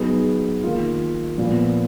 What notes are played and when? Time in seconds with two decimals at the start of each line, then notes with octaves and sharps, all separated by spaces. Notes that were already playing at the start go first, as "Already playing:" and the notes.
Already playing: F#3 B3 D#4 G#4
0.64 D#3 A#3 F4
1.38 A#2 F3 B3